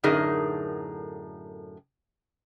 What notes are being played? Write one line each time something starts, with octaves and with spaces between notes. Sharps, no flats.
F#2 A2 D3 D#4 G#4 A#4